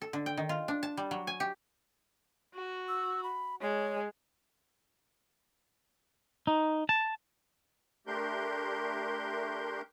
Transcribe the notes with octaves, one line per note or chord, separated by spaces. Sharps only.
A4
D3
G5
D#3
F4
D4
A5
G3
F#3
G#5
G4
F#4
E6
B5
G#3 C#5
D#4
A5
A3 D4 G4 A#4 C6 G6